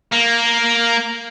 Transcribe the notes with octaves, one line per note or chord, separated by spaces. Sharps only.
A#3